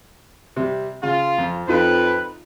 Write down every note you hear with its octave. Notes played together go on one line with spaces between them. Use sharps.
C3 G3
C#3 F4
F2
F2 D#4 F4 B4